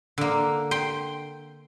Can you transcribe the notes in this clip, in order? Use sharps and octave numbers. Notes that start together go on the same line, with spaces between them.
D3 A#3
G5 C6